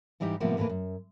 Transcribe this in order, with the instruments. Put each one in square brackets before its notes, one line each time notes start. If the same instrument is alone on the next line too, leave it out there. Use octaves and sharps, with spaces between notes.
[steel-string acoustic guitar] G#2 E3 G3 D#4 E4 G4
A2 C3 F3 G3 A#3 B3
D#2 A2 E3 A#3 B4
F#2